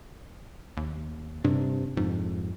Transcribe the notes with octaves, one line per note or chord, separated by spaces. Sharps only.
D#2
G2 C3 D4
F2 G#2